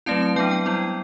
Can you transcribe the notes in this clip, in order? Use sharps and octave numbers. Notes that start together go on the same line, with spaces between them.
F#3 A3 C4 E4 A5
A5
F#3 B3 D4 G5
G5
G3 B3 E4